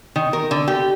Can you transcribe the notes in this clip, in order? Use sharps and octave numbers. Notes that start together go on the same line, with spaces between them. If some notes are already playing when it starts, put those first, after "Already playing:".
D#3
A#4
D3
G4